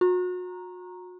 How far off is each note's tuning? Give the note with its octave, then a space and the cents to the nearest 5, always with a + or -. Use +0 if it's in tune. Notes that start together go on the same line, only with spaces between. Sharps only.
F#4 -35 A#5 +0